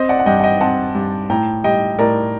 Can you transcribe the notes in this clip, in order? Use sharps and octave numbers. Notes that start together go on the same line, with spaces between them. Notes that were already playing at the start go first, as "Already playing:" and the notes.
Already playing: C4 C5 D#5
D5 F#5
F#5
G2 D#5 G5
F#5
D#5 G5
C4 F#5 A5
G2
A2 G5 A#5
G3 D#5 G5
A2 A#4 D5